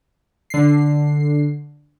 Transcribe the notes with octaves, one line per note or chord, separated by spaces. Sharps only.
D3 C7